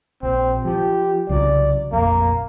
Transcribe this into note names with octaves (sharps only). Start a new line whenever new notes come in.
A#1 C4
F3 G4
C2 C#3 F#3 D5
F1 A#1 F2 A#3